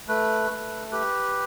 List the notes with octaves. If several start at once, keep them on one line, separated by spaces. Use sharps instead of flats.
A3 B4
A3
G4 B4